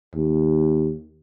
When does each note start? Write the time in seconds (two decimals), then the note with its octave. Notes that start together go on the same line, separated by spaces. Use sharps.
0.15 D#2